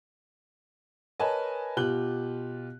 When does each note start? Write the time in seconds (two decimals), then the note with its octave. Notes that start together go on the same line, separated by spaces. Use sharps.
1.20 A#4 B4 C#5 D#5 G#5 A5
1.77 B2 F4 G4 F#6 G7